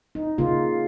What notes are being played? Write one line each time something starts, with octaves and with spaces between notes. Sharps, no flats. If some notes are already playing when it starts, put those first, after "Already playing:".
D#4
C#3 A#3 F4